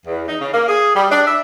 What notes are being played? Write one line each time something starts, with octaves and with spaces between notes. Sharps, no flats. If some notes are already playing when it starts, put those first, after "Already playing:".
E2
D#4
C#3
A#3
G#4
G3
D4
E5